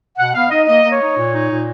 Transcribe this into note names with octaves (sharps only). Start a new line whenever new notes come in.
B2 F#5
B3 F5
D#4 D#5
A#3 D#5
A#3
C#5
D#4
A#2
D#4
A#2